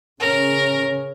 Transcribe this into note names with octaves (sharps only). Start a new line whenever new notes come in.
C#3 C#4 A#4